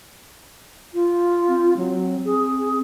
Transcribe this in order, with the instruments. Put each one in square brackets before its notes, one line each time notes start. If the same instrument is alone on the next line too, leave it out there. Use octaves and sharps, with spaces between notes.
[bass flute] F4
[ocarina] C4
[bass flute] F#3
G#4